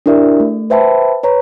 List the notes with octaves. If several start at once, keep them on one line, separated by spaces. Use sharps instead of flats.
D4 E4 G4 A#4 D5 E5
A3
B4 C5 E5 G5 A5 B5
B4 C#5 A#5